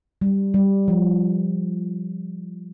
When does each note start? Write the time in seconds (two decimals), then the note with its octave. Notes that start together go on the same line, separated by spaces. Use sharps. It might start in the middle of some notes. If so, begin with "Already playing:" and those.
0.22 G3
0.54 G3
0.88 F3